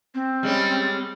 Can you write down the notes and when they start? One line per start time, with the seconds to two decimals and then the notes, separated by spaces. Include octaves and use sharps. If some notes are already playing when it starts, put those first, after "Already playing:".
0.15 C4
0.43 G3 G#3 C#4